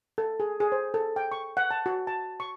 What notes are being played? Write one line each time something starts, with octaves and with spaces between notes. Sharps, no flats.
A4
G#4
G#4
C5
A4
G5
C#6
F#5
A5
F#4
A5
C#6